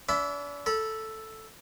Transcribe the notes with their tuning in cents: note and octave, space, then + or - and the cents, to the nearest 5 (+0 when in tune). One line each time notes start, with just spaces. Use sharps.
D4 -40 E5 +0 B5 +20
A4 +0 B5 -30